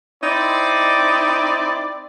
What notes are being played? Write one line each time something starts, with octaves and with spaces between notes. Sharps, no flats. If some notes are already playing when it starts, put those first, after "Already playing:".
C4 D#4 E4 D5